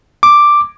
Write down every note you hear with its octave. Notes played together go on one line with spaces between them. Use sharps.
D6